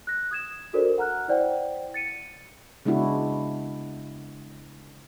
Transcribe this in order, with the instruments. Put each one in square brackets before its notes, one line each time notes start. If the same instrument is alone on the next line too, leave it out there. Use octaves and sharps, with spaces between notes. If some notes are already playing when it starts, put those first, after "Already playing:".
[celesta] F#6 A#6
D#6 G#6 E7
D4 F#4 A4 A#4 C5 D5
F#5 A#5 F6 F#6
E4 C5 D5 F#5 G5
A6 C#7 D#7
[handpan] C#3 G#3 B3 D4 E4 F#4